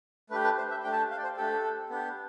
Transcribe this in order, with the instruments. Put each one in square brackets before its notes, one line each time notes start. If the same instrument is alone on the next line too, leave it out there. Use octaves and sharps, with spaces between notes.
[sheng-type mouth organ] A3 D4 G4 B4
B4
C5
E5
A3 D4 G4 G5
A5
G5
F5
D5
C5
A3 D4 G4 A4
B3 D4 G4